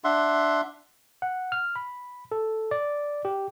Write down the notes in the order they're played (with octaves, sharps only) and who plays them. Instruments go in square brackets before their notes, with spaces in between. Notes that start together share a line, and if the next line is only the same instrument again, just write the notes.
[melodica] D4 E5 F#5 C6
[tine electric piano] F#5
F6
B5
A4
D5
G4